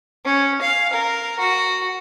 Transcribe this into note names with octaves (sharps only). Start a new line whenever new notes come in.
C#4
F5
A#4
F#4